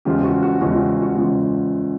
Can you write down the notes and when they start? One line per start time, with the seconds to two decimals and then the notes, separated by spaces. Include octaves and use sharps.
0.05 E2 C#3 F3 G#3 F4 G4
0.24 F#4
0.43 F#4
0.61 E2 C#3 F3 G#3 F#4
0.74 F4 G4
1.02 F#4
1.16 E2 C#3 F3 G#3 F#4